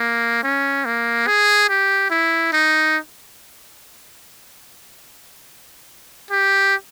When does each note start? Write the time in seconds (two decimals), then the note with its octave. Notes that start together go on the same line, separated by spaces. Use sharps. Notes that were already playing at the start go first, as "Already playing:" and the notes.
Already playing: A#3
0.44 C#4
0.85 A#3
1.27 G#4
1.69 G4
2.11 E4
2.53 D#4
6.31 G4